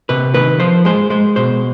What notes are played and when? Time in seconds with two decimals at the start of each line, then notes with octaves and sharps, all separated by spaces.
0.09 C3 B4
0.34 D#3 B4
0.60 F3 C5
0.85 G#3 C5
1.10 G#3 C5
1.36 B2 C5